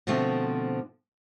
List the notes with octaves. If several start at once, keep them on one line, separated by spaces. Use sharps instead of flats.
B2 D3 F3 A3 C4